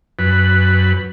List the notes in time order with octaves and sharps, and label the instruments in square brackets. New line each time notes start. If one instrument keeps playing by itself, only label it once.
[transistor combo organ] F#2 B4